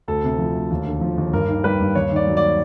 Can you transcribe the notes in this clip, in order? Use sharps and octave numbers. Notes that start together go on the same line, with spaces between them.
D2 A4
C3
F3
D2
D#2
D3
F3
D#2
G2 A#4
D#3
G3 B4
G2
D#2 C#5
D#3 D5
F#3
D5